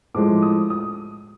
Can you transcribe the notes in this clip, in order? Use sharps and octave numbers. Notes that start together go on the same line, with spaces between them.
A2 F3 G#3 D6
D#6
D#6